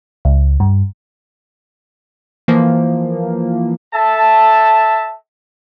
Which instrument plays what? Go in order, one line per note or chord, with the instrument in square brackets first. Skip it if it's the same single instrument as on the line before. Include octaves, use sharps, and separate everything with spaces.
[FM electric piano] C#2
G2
[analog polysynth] E3 F3 A#3
[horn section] A4 E5 A5